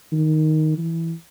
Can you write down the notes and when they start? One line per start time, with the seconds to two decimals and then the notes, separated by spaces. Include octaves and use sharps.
0.12 D#3
0.78 E3